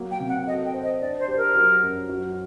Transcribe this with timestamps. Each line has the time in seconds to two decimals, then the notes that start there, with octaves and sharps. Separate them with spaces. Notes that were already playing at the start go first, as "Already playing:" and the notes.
Already playing: F#3 A#3
0.11 G5
0.20 C3
0.28 F#5
0.47 A4 D#5
0.66 G5
0.74 C5
0.83 D#5
1.00 D4 D5
1.19 C5
1.28 G4
1.37 A#4
1.55 F#3
1.82 F#2
2.10 F#3